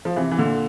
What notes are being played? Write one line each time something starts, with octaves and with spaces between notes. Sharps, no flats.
F3
C3 E3
E3
A#2 D3